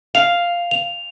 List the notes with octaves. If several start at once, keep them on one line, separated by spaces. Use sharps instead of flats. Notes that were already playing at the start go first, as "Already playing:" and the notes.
F5 F7
F7